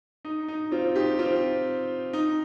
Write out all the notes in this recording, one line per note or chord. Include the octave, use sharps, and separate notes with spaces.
D#4
D#4
C4 F4
D#4 G4
C4 F4
D#4